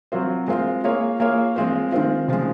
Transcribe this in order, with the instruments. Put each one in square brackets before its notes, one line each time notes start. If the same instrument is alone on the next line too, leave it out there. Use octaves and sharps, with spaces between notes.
[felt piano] F#3 C4 F4 C5
G#3 C4 F4
A#3 F4 G#4 C#5
A#3 F4 G#4 C#5
F3 G#3 C4 F4 C5
D#3 G#3 C4 F4
C#3 F3 G#3